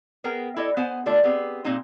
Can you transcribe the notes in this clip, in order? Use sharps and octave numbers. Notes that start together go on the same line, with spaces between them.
B3 G#4 A#4 G5 A#5
E4 G4 A4 D5 D#5
B3 C5 F#5 G#5
D3 A3 D4 F4 D5
B3 C4 G4 G#4
A#2 G#3 C4 D#4 D#5